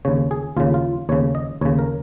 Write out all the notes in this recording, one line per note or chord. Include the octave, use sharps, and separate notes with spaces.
D#2 C#3 C#5
G#4
D#2 C#3 F4
F4
D#2 C#3 C#5
D#5
D#2 C#3 C#5
A#4